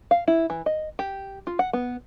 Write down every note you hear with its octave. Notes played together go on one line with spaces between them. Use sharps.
F5
E4
E3
D#5
G4
F4
F#5
B3